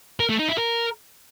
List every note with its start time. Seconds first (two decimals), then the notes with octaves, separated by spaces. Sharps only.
0.20 A#4
0.29 A3
0.39 D#4
0.49 E4
0.58 A#4